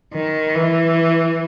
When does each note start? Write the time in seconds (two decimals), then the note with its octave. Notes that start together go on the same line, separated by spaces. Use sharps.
0.14 D#3
0.55 E3